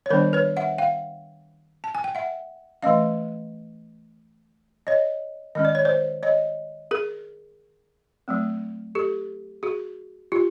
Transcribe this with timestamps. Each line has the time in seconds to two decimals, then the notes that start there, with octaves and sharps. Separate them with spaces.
0.06 C#5
0.10 D#3 G3 B3 D4 A#4 C5
0.33 B4 C#5
0.57 E5 F#5
0.78 F5 G5
1.84 A5
1.95 G#5
2.04 G5
2.15 E5 F#5
2.82 E3 A3 C#4 D#5 F5
4.87 C#5 D#5
5.55 D#3 G#3 C#4 D#5
5.65 D5
5.75 C#5
5.85 C5 D5
6.23 C#5 D#5
6.91 G#4 A#4
8.28 F#3 A3 C4
8.95 G4 A4
9.63 F#4 G#4
10.32 F4 G4